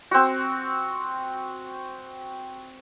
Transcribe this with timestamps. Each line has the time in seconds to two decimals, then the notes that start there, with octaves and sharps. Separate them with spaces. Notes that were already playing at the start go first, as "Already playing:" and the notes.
0.11 C4 F#4